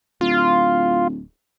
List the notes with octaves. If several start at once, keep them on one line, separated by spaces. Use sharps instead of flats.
D1 F4